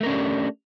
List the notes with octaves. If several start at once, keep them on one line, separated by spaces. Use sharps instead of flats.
A3 C#4 D4 G4 A#4